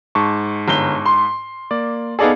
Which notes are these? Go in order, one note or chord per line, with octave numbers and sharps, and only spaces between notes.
G#2 A5 C#6
G1 G7
C6
A#3 D5
B3 D#4 G#4 A4 D5 F5